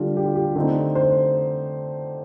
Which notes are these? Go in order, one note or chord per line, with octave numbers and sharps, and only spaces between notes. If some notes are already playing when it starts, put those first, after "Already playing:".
Already playing: D3 G3 D4 F4
G4
F4
G4
D3 A3 C4 D#4
C5